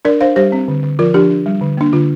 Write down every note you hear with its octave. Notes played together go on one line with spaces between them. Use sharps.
D4 A#4 D5
D4 C5 F5
G3 G4 C5
C4
D3
D3
F3 F4 A#4
F3 D4 G4
D4
G3
D3
A#3 D4
D3 F4